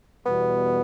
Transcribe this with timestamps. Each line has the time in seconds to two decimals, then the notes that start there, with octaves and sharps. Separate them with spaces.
0.25 E2 B2 G3 B3